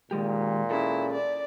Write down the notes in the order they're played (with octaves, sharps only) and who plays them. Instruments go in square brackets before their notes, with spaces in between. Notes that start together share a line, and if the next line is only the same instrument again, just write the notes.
[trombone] A#2 [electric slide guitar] D#3 G#3 G4
[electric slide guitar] C#4 G#4 A4 [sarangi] E4
[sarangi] D5